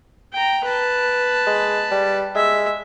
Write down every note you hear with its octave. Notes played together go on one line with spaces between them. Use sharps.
G5 A#5
B4 A5
G#3
G3
G#3 E5